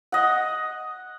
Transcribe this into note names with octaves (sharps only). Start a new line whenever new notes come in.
D#5 F#5